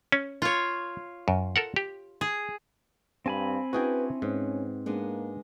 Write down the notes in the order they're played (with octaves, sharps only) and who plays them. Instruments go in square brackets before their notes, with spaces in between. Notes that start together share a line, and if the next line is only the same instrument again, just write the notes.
[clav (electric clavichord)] C#4
[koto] F4 C#5
[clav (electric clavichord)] F#2
A4 A#4 F#5
G4
[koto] G#4
[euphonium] G2 [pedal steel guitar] C4 G#5 B5 [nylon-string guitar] F5
[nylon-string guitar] C#4 D4 E4 [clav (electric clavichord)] F#4 G#4 G5 [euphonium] B4
[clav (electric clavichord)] G#2 [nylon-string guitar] B3 [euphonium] C#4
[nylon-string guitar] G#3 B3 D4 [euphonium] A#3